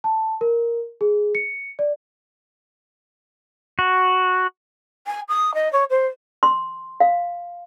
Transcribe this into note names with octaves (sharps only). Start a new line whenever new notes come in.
A5
A#4
G#4
C#7
D5
F#4
G#5
D#6
D#5
C#5
C5
C6
F5